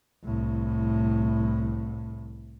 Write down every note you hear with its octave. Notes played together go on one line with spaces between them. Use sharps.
C2 A2